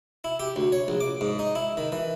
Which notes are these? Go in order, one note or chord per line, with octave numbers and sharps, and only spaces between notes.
E4
G4
D2
C#5
A#1
D6
G#2
D#4
E4
D#3
E3